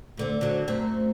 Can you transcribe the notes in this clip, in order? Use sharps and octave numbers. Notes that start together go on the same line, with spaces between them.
D2 D3 C4
D3 F#3
F#2 A3 C4